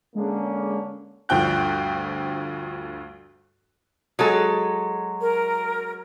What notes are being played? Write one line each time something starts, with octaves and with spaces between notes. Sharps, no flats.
D3 G#3 A#3 C#4
D2 G2 F3 G5 F#6
F#3 G#3 A4
A#4